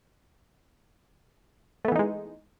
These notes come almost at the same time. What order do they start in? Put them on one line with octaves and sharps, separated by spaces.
A3 B3 E3 D#4 G#3